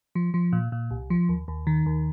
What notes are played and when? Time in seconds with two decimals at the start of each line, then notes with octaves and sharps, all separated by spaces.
0.15 F3
0.34 F3
0.52 A#2
0.72 A#2
0.91 C2
1.10 F3
1.29 D#2
1.48 D#2
1.67 D#3
1.86 D#2